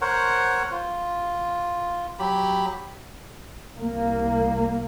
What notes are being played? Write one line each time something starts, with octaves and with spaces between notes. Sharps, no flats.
A#4 C5 C#5 F#5
F4
F#3 G4 B5
C2 A#3